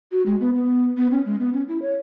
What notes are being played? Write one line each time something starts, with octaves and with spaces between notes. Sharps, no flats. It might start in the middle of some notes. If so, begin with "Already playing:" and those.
F#4
G#3
B3
B3
B3
C#4
G#3
B3
C#4
E4
C#5